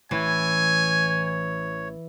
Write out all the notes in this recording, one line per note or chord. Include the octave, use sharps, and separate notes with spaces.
A1 E3 C#5 G#5